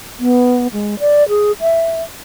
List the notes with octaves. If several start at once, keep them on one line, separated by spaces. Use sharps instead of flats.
B3
G#3
D5
G#4
E5